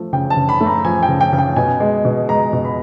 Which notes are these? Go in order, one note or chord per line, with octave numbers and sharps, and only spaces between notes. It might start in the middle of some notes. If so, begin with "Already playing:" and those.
Already playing: F3 A3
C#3 G5
A5
C#3
B5
A3
A#5
F3 G#5
G5
C#3
G5
C#3
G5
B2 G#5
G#3
B2
G#3 A#5
B2
B5